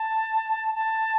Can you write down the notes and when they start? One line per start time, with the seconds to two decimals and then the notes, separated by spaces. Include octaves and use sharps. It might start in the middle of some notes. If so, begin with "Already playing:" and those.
Already playing: A5
0.75 A5